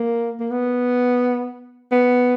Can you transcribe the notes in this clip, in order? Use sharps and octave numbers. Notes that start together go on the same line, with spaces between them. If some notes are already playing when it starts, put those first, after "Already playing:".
Already playing: A#3
A#3
B3
B3